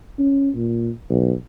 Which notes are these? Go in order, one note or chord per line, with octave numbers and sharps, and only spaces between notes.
C#4
A#2
B1